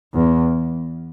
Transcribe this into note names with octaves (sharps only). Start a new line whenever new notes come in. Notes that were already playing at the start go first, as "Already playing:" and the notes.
E2